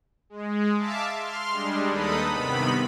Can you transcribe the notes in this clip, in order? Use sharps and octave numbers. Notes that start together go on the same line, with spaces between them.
G#3
E5 F5 A5 D6
C6 F6
G3 G#3 D4
D#2 D#4 A4 B4 B5 D#6
G2 C3 D#3 B3 B5